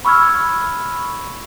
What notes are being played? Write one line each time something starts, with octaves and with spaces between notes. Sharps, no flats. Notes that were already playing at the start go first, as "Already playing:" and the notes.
B5 C#6 E6 F6 G#6